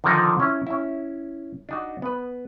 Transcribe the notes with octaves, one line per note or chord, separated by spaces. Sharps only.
D3 D#3 F3 D#4
C#4 E4
C#4 E4
D4 D#4 F#4
B3 B4